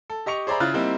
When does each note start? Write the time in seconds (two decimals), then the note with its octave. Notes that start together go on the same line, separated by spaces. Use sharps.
0.10 A4
0.26 G4 D#5 C#6 C#7 F7
0.47 G#4 C5 D5 E5 A#5 B5
0.60 C#3 E4 F4 F6 F#6 A6
0.74 G3 A#3 C4 D#4 E4